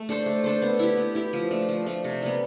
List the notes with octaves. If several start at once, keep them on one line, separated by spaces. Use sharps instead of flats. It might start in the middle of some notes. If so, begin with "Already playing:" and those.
Already playing: A3
D4 A4 C5
A3
D4 A4 C5
B3
E4 G4
B3
E4 G4
F3
A3 D4
F3
A3 D4
C3
G3 B3